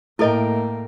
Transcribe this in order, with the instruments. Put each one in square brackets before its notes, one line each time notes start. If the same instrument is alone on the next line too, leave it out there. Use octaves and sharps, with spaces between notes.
[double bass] A2 A#3 [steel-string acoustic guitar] A3 A#4 G5 [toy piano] E4 A4 D#5